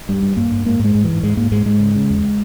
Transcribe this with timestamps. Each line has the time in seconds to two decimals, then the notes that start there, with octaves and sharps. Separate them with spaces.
0.09 G2 G3
0.23 G2
0.37 G2 A#3
0.51 G2
0.65 G#2 A#3
0.80 G#2 G#3
0.95 G#2
1.04 E3
1.09 G#2
1.23 G#2 G#3
1.37 G#2 A#3
1.52 G#2 G#3
1.66 G#2 G#3
1.80 C#3
1.95 C#3
2.10 E2